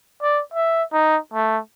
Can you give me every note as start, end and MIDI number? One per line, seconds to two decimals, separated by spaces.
0.22 0.42 74
0.54 0.83 76
0.93 1.18 63
1.34 1.59 57